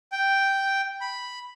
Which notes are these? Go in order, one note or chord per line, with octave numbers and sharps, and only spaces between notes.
G5
B5